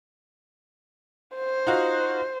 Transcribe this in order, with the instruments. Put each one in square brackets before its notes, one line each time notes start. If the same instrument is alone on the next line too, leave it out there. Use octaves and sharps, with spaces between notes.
[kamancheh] C5
[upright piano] D#4 F4 F#4